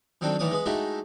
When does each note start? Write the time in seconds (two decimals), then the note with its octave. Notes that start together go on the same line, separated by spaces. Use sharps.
0.21 D#3 F#3 C4 D4 F#4 A4
0.39 A2 D#3 E3 C#5 D5 D#6
0.51 G#3 B3 G#4
0.66 G#3 A3 D#4 E4 F#4 G4